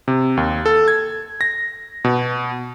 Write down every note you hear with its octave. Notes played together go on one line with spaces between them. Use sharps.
C3
D#2
A4
G#6
A#6
B2